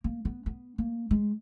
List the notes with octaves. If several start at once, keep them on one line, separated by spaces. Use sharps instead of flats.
A#3
B3
B3
A#3
G#3